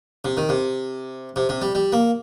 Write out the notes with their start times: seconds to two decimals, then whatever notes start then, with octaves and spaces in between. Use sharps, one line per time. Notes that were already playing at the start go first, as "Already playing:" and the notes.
0.25 C3
0.37 D#3
0.49 C3
1.36 C3
1.49 C3
1.62 G3
1.75 G3
1.92 A#3